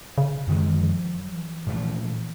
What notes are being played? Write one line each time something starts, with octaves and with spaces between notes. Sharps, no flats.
C#3
F#2 D3 D#3 G#3
E3
F3
F#3
F3
E3
A#2 F3 A3